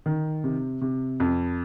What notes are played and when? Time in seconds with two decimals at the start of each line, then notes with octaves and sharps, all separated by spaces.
0.06 D#3
0.44 C3
0.81 C3
1.20 F2